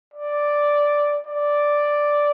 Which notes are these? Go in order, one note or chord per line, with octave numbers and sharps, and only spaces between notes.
D5
D5